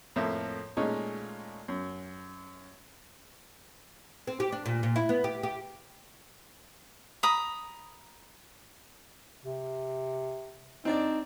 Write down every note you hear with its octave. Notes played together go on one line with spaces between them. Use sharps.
F2 A2 A#3 E5
A#2 G#3 A3 C#4 D#4
F#2
C4
G4
D4
A#2
A#2
E4
B3
G4
G4
A#5 B5 D#6
C3
C4 D4 D#4 D5